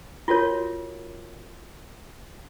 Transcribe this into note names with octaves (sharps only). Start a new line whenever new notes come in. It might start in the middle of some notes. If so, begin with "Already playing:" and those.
F4 F#4 A#4 C#5